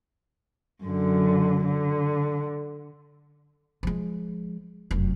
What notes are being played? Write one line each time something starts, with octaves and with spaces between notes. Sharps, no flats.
F#2 D3
D3
F3 G#3
F1 F#2